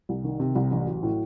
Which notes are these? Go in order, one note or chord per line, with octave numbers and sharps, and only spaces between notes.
C2
D#3
C3
C2
A1
F#3
A2